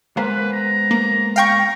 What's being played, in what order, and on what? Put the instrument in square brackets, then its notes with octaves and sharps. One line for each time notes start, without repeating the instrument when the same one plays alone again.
[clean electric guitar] G#3 B3 C5 [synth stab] A#3 [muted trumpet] B4
[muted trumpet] A#5
[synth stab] A#3
[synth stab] F5 G5 C#6 [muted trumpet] A#5